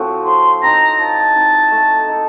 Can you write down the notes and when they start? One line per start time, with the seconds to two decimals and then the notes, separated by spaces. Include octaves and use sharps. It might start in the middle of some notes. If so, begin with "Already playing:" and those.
Already playing: A2 F3 C4 F#4
0.26 F3 C6
0.62 C4 D#4 A#5
0.99 F3 A5
1.36 C4 D#4
1.71 A3
2.08 D#4 A4